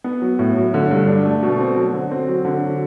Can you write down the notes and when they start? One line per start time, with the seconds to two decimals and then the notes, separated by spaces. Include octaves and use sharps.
0.04 B3
0.22 F#3
0.39 A2
0.57 F#3
0.74 D3
0.91 G2
1.07 D4
1.25 A3
1.43 B2
1.59 C4
1.76 F#3
1.93 D3
2.11 C4
2.28 F#3
2.45 D3
2.63 F#3